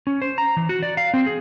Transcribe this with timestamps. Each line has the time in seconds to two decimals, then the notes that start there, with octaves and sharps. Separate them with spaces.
0.07 C#4
0.22 C5
0.38 A#5
0.57 E3
0.69 F#4
0.83 D5
0.97 F5
1.14 C4
1.26 G#4